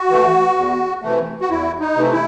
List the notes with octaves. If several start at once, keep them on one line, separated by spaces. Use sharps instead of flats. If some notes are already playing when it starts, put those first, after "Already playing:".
Already playing: F#4
E3 A3
E2
C3 E3 A3
F#4
E2 E4
D#4
C3 E3 A3
E4